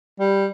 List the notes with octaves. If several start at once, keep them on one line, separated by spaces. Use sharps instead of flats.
G3